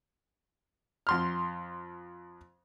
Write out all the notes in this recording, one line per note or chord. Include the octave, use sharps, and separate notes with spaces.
F2 C6 F6